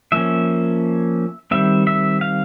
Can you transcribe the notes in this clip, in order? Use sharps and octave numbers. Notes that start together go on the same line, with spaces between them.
F3 A#3 C#4 E5
D#3 G3 C4 E5
E5
F5